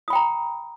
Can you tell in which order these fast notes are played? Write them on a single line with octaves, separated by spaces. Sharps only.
D#6 B5 G5 A#5